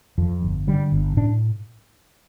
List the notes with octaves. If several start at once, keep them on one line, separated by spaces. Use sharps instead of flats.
F2 F3
G1
D3 G3
G1
A2 D4